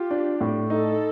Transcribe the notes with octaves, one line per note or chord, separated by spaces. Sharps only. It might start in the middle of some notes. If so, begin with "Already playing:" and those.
Already playing: F4 G4
D4
A2
D#4 A4